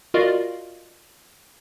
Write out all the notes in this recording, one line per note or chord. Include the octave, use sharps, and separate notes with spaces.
F4 F#4 A#4 D5 D#5 F5